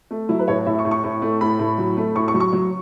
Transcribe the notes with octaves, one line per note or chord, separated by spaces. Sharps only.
A3
F#3 E4
B4
A2 C#5
A2 E5
C#6
A2
C#6
A2
A3
A2 B5
A2
F#3
A3
A2 C#6
C#6
F#3
C#6
F#3